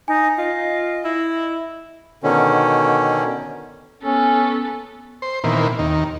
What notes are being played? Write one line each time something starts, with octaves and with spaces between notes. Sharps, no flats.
D#4 G#5
F4 D#5
E4
B2 D3 D#3 C#4
B3 C#4 A4
C5
A#2 D#3 E3 B3 C4
D#2 D#3